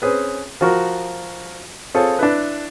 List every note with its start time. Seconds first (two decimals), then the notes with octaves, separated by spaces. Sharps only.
0.02 C4 C#4 G#4 B4
0.61 F3 F#4 A#4
1.94 C4 F4 G#4 A4 C#5
2.19 D4 E4 B4